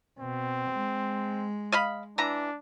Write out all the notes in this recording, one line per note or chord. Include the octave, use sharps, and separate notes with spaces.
B2 C4
G#3
D#5 F5 B5
E3 D4 A#5